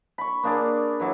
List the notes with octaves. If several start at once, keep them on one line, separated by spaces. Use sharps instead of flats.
B5 C#6
A#3 D4 G#4 D5
E3 F#3 E5